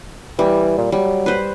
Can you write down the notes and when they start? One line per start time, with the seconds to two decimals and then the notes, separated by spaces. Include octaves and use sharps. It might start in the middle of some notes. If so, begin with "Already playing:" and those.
0.39 E3 G3
0.78 A#2
0.92 F#3 G3
1.26 B4 C5